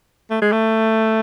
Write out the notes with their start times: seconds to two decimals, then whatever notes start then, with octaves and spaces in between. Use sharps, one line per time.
0.31 A3
0.41 G#3
0.52 A3